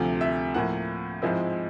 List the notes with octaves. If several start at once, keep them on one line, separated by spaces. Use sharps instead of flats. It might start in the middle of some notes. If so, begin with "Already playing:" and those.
Already playing: D2 C3 F3 A3
E5
A2 F3 A#3 F#5
G#2 F3 G#3 C4 E4